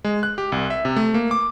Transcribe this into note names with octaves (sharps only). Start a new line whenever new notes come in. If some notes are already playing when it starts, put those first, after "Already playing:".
G#3
F#6
G4
C2
E5
C3
A3
A#3
D6